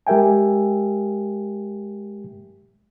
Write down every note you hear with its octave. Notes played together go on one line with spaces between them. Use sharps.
G#3 G4 A#4 E5 G5 G#5